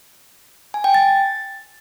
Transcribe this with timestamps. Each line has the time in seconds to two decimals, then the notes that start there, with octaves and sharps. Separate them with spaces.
0.74 G#5
0.84 G5
0.94 A6